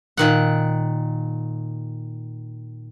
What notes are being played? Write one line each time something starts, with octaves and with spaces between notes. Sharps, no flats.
A#2 D#3 F#5